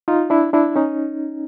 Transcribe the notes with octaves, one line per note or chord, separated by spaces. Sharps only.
D#4 F4
D4 E4
D4 E4
C#4 D#4